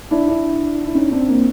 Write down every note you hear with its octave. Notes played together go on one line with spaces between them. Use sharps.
D4 E4
D4 E4
E4
C#4 D#4
C4 D4
A#3 C4